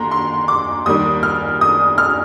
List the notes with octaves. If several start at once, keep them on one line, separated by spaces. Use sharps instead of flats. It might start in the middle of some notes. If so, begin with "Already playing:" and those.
Already playing: D#2 D3 A#5 C6
C6
D6
D#2 D#3 G3 D#6
F6
D#6
F6